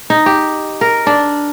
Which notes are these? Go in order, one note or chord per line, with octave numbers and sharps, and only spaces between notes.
D#4
G4
A#4
D4